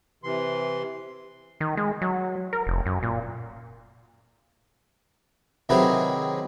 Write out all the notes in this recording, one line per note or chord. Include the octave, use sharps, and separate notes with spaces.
C3 E3 C6
D#3
G#3
F#3
A#4
F1
F#2
A#2
C3 D#3 F#3 E4 G#4 B4